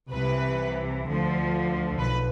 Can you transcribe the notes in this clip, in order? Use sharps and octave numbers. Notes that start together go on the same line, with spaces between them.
C2 C3 E3 B4
D2 D3 F3
B1 B4